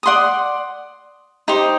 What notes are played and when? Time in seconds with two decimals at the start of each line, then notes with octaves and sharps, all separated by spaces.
0.03 D5 F#5 C6 D#6
1.48 D#4 G4 C5